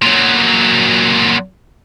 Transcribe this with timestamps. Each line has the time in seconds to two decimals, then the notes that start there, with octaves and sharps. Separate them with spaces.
0.02 A#2 F#3